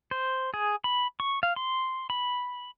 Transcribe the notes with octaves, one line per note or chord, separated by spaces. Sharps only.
C5
G#4
B5
C#6
F5
C6
B5